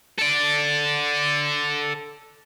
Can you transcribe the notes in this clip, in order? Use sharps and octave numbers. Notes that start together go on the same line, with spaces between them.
A4 D5